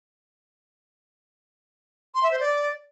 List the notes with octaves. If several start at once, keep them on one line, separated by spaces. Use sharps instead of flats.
C6
E5
C5
D5